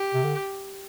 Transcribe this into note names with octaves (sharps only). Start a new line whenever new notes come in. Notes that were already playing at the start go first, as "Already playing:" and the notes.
Already playing: G4
C3
D3